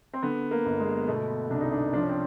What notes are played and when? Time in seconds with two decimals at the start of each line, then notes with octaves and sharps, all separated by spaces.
0.13 C4
0.22 D3 B3
0.51 A#3
0.66 G1
0.80 G#3
1.08 B2 A3
1.50 C2 D4
1.61 D#4
1.72 D4
1.93 F3 D4
2.02 C#4
2.09 C4